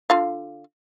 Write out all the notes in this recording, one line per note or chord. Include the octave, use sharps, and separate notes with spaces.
D3 F4 F5